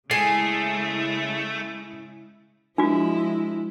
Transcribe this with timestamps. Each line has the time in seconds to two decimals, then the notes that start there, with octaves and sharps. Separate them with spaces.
0.11 C#3 G#3 A3 E4 G#4 G#5 C7
2.78 F3 G#3 D4 E4 F#4